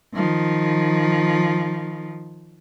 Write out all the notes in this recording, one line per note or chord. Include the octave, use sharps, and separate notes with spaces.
D#3 F3